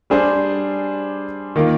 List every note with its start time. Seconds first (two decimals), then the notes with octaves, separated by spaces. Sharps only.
0.10 G3 D4 G#4 C5
1.56 D#3 A#3 F4